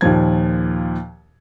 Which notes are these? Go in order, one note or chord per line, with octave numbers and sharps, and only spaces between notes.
D#2 A#2 F3 G#6